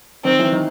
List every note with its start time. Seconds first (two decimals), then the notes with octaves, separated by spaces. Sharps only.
0.25 D#3 C4
0.39 E3
0.52 D#3